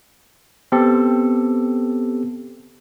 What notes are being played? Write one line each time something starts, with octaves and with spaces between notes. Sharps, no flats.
B3 C4 G4 A4